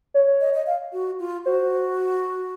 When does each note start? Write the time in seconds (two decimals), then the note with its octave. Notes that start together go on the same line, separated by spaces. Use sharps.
0.14 C#5
0.41 D#5
0.54 D#5
0.67 F5
0.93 F#4
1.19 F4
1.45 F#4 C5